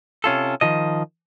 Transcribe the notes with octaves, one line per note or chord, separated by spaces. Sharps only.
C3 C#4 F4 A4
D#3 F3 D#5